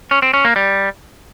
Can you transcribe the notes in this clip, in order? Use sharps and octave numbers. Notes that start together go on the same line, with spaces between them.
C#4
C4
C#4
A#3
G3